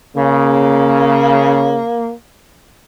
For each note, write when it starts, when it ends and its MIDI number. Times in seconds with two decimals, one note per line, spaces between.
0.16 1.80 49
0.16 2.12 58